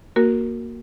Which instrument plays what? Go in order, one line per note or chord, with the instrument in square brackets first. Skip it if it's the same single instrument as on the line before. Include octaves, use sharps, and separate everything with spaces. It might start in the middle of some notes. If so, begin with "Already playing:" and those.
[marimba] A#3 F#4 A#4